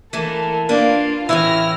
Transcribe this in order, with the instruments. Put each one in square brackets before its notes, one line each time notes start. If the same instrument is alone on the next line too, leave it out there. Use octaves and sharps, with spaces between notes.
[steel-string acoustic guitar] E3 A3 A#3 [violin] A4 A#4
[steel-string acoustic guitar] A#3 D4 B4 [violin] F4 F5
[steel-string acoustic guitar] A2 C#3 E3 [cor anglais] E4 [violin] F6 A#6